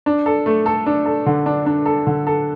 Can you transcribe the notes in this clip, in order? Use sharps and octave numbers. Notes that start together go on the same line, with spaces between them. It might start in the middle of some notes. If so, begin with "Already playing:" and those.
D4
A4
A3
A4
D4
A4
D3
D4
D4
A4
D3
A4